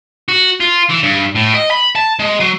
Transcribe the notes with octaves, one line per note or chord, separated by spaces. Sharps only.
F#4
F4
E3
G2
A2
D#5
B5
A5
G#3
F#3